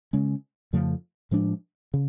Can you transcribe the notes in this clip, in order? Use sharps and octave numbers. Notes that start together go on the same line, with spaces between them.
C#3 G#3 C#4
F2 C#3 F3 A3
A2 F3 G#3 D4
C#3